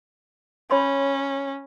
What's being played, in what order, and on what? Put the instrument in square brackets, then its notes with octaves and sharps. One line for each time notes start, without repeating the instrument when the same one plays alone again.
[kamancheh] C#4 [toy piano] C#5 B5 C6